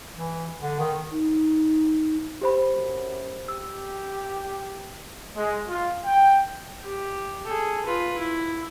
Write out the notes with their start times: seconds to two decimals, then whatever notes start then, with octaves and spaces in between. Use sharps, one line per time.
0.15 E3
0.62 D3
0.79 D#3
1.12 D#4
2.41 G4 C5 B5
2.75 F#2
3.48 G4 E6
5.36 G#3
5.69 F4
6.05 G5
6.81 G4
7.45 G#4 A4
7.85 F4 B4
8.18 E4